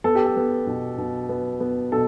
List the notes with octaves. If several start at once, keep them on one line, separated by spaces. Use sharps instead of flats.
B3 A4
G4
A4
B3
B2
B2
B3
B3
B2 A4